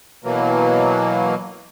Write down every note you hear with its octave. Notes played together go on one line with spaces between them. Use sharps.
B2 E3 F#3 A#3